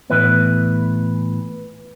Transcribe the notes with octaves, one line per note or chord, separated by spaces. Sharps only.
A2 E3 B3 B4